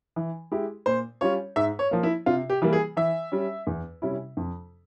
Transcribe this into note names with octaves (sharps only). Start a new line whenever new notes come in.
E3
G#3 E4 G4
A#2 C5
G3 C#4 F4 C#5
G#2 E5
C#5
F3 A#3
E4
C3 F4
G4
E3 G3 A#3
G#4
E3 E5
G3 C#4
E2
C3 G3 C#4 E4
F2